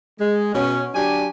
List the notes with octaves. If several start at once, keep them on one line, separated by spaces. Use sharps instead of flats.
G#3
B2 C#4
F#3 D4 G4 G#5